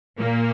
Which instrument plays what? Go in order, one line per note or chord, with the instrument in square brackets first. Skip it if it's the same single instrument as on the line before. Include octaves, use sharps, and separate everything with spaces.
[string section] A#2 A#3